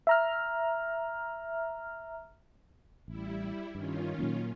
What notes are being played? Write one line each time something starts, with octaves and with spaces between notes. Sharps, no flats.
E5 A#5 F6
A1 G3 E4
G2 D#3 C#4 F4
A#2 F#3 A#3